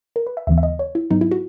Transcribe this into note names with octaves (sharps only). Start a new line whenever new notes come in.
A#4
B4
E5
D#2 C#3 E3 G#3 B3 E5
E5
D#5
C#5
E4
G#2 F#3 B3 D#4
E4
F#4